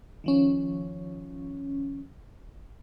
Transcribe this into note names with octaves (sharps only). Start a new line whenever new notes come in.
D#3 F3 C#4